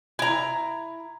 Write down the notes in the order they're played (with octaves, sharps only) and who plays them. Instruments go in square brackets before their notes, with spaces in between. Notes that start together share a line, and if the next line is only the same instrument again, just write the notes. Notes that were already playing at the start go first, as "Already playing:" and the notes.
[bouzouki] E4 A#5